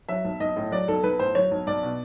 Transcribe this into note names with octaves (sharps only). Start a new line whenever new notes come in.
F#3 E5
B1
B1 D#5
A2
F#3 D5
B1 A4
B1 B4
A2 C5
F#3 C#5
B1
B1 D5
B2